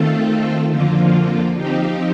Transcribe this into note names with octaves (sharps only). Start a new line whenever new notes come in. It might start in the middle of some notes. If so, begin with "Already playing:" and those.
Already playing: D#3 A3 C4 F4 A4
F2 D3 F3 A#3 F4
F3 C4 D#4 G4